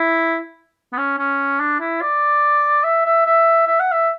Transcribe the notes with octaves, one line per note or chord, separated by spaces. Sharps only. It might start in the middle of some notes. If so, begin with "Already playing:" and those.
Already playing: E4
B3
C#4
C#4
D4
E4
D5
E5
E5
E5
E5
F#5
E5